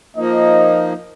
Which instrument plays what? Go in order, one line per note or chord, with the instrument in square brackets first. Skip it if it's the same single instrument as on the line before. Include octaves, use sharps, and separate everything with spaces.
[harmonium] F3 A#3 D#4 [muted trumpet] D#5